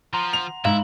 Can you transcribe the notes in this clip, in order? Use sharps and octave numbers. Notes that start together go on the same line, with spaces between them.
F3 F#5 A#5 C6
F7
G#2 E4 F5